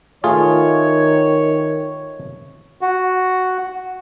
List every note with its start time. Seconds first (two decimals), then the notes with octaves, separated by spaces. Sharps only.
0.24 D#3 A3 F4 G#4 C#5
2.81 F#4